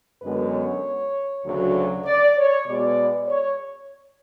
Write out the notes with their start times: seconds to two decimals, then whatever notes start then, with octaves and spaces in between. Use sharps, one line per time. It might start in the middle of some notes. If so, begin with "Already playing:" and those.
0.22 F#2 D3 G#3 B3 B4
0.52 C#5
1.44 D2 C#3 F#3
2.05 D5
2.36 C#5
2.66 B2 G#3 B3 D5
3.28 C#5